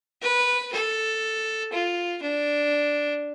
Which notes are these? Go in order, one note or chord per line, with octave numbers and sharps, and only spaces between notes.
B4
A4
F4
D4